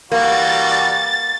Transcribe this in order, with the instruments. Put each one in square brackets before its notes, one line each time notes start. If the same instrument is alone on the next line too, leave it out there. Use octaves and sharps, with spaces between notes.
[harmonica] E3 G3 F#4 [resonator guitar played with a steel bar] A#3 [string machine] A6